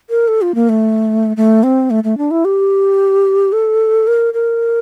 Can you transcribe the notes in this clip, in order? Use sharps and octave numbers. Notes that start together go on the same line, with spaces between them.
A#4
A4
F4
A#3
A3
A3
C4
A3
A3
D4
E4
G4
A4
A#4
A#4